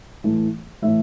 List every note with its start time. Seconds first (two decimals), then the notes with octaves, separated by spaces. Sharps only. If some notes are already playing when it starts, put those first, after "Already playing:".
0.24 A2 E3 A3
0.82 A2 E3 A3 E5